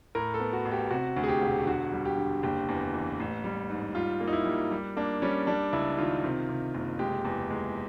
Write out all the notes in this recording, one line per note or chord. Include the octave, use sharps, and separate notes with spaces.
A2 A#4
A4
B3
F#4
A1
G4
C3 F#4
D2
G#4
G4
E1
D3 F#4
G3
G4
D3
F#1 G4
E2
E3
A1
G3
G#2
G3 F4
A#3
D#4
E4
G3
G3
A#3 D4
G3 C#4
G3 D4
C#2 E4
D#3 F4
C3
C3
F#1
G#3 G4
E2
G#3